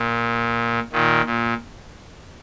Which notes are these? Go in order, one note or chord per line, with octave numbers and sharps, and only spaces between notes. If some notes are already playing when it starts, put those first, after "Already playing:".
Already playing: A#2
A#2 D#3
A#2